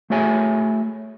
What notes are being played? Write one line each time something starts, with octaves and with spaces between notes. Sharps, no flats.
A3 F#4 G#4 C#5 E5 G#5